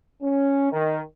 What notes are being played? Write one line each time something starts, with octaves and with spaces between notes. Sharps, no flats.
C#4
D#3